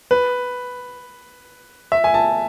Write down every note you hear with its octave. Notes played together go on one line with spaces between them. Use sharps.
B4
E5
G#5
A5